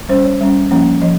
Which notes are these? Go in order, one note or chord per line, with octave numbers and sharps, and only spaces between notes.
G3 C#4 C5
C#5
G3 C#4
F3 A#3 C#4
F3 D#5